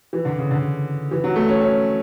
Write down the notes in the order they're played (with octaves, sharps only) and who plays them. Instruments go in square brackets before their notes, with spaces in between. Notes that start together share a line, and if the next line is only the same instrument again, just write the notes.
[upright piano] E3
D3
C#3
D3
E3
F#3
A3
C#4
C#4